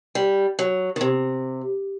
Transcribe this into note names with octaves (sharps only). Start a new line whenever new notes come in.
G3
F#3
D#3
C3